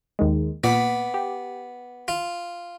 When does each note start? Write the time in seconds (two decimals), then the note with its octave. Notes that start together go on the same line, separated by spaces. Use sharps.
0.19 D#2 D#3 G#3
0.64 A#2 B3 D5 B6
1.14 G4
2.08 F4